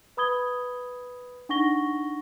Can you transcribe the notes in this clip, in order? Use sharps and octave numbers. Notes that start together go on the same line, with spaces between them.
B4 B5 D#6 G#6 G7
D4 D#4 F#5 C#6 A#6 G7